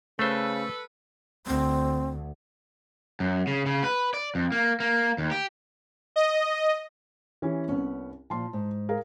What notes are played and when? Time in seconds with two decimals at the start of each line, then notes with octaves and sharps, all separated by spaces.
0.19 C#3 A3 A4 B4 C5
1.47 D2 C4
3.20 F#2
3.47 C#3
3.66 C#3
3.84 B4
4.14 D5
4.35 F2
4.52 A#3
4.80 A#3
5.18 D#2
5.31 G4
6.16 D#5
7.42 E3 C#4 G4
7.68 C2 B3 C#4
8.30 A#2 F3 A5 C6
8.53 G#2
8.89 G#4 A#4 F5